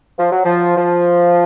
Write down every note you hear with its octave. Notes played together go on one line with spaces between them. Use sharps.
F3
F#3
F3
F3